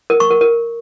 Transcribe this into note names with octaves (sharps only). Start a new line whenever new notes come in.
A#4
C#6
A#4
A#4